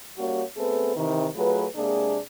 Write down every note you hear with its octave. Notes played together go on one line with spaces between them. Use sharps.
G3 A#3 C#4 F#4 G4 C#5
A3 B3 C4 G#4 A4 B4
C3 D#3 E3
F#3 A3 F4 G#4 B4
C3 G#3 A#3 D4 G#4